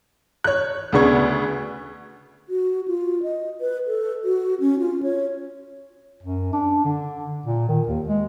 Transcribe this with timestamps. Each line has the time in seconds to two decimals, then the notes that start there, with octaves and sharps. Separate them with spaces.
0.44 C#5 F#6
0.93 D2 C#3 B3 D4 C#6 G#6
2.49 F#4
2.88 F4
3.23 D#5
3.61 B4
3.87 A4
4.24 F#4
4.60 C#4
4.79 F4
5.03 C#5
6.23 F#2
6.53 D4
6.85 D3
7.46 A#2
7.69 D#3
7.87 D#2
8.07 G#3